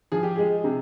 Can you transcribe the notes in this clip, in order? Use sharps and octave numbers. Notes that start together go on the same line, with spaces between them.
F3 G#4
G4
G#3 G#4
C3